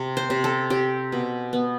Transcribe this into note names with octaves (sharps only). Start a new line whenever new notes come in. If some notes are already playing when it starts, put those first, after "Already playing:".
Already playing: C3
C5
C3
A4
C4 G4
B2
B3